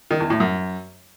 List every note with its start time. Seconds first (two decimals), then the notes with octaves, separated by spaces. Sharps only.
0.11 D#3
0.20 E2
0.30 A2
0.40 F#2